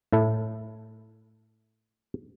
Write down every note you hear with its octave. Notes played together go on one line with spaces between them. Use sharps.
A2 E4 A4